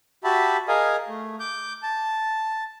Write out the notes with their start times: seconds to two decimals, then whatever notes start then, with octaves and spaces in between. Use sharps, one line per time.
0.24 F#4 G4 E5 A5 B5
0.68 G#4 A#4 D#5 F5 G#5
1.08 A3
1.40 D6 G6
1.83 A5